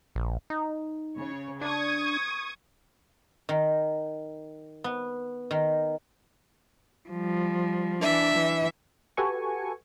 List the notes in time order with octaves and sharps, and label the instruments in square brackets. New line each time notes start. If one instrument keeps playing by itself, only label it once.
[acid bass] A#1
D#4
[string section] C#3 C#5
[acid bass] D4 [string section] C#6 D#6 G#6
[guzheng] D#3
B3
D#3
[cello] F3 G3
[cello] E3 D4 [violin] E5
[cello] E3
[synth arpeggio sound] F#4 G4 A4 B4 G#5 C#6